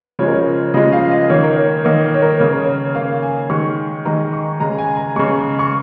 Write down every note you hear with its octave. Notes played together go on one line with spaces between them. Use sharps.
C#3 F3 G#3 C#5
A#4
C#5
C#3 F3 G#3 D#5
F5
D#5
D#3 A#3 C#5
A#4
C#5
D#3 A#3 D#5
C#5
A#4
C#3 A#3 C#5
A#4
C#5
C#3 A#3 F5
G#5
D#3 G#3 C#6
D#3 G#3 A#5
C#6
C#3 G#3 A#5
G#5
A#5
C#3 G#3 C#6
C#6